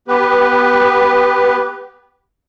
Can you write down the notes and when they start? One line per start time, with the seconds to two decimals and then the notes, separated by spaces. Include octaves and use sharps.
0.08 B3 G4 B4